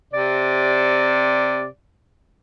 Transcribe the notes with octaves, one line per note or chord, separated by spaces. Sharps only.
C3 D5